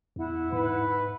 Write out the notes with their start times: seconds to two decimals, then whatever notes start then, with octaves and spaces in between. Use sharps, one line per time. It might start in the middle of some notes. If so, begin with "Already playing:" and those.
0.16 E2 E4 F#5
0.52 G#2 B4